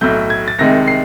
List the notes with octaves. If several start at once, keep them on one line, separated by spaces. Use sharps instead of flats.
B1 A2 F#3 A3 G6
G#6
A6
C2 C3 D#3 G#3 A#6
C7